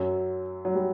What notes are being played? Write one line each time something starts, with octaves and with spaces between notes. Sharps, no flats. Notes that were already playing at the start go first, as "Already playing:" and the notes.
Already playing: F#2 F#3
F#3
G3